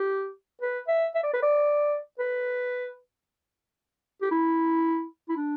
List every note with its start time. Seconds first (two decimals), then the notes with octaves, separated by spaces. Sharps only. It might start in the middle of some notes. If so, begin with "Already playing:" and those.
Already playing: G4
0.61 B4
0.88 E5
1.15 E5
1.23 D5
1.33 B4
1.42 D5
2.19 B4
4.22 G4
4.31 E4
5.29 E4
5.37 D4